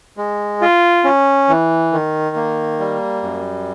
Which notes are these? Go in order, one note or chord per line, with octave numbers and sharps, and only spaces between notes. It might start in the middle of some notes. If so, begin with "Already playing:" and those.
G#3
F4
C#4
E3
D#3
A#3
G3
F#2